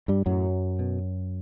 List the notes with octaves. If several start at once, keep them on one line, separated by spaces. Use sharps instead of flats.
G2 G3
F#2 A2 F#3
B2